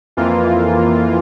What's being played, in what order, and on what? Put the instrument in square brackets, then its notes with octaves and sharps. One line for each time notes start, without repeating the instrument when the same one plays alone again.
[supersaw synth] F2 E3 A#3 F4